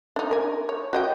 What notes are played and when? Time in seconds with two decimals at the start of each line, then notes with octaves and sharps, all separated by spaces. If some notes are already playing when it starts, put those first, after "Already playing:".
0.16 D4 D#4
0.31 A#4 G#5
0.69 C#5
0.93 F#4 D#5 G5